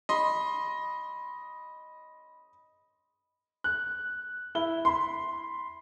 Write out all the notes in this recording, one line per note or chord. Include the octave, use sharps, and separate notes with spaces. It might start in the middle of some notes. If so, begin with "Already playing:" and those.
D#5 B5 C6
F#6
E4 G7
B5 C6